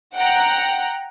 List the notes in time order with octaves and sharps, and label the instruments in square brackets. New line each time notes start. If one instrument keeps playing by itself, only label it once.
[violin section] F#5 G5 A#5